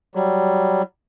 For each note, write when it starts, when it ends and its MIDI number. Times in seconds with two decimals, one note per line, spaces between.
0.15 0.82 54
0.15 0.82 55